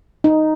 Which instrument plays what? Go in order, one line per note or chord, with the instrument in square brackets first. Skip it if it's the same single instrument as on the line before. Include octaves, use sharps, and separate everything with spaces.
[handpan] D#4